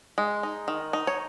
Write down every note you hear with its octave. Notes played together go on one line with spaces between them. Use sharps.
G#3
D#4
D#3
D#4
C#5